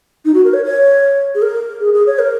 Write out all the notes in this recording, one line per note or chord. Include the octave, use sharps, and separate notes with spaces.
D#4
F#4
A#4
C#5
C#5
G#4
A#4
G#4
G#4
C#5
A#4